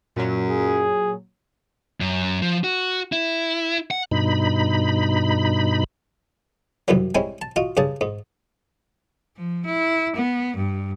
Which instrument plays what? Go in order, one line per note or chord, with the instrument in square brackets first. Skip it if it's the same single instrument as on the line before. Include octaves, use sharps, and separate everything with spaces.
[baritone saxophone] F#2 [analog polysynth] A#2 F#3
[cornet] G#4
[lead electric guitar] F#2
F3
F#4
E4
F#5
[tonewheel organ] G2 B2 D#4 B5
[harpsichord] C2 F#2 C3 E3 F#3
G3 G#3 C4 C#4 E4
A5
F4 F#4 D#5
G2 C#3 G#4 A5
G#2
[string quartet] F3
E4
B3
G2